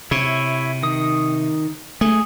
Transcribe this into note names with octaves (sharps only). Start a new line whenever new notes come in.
C3 E4 C#5
D#3 D#6
A3 G#4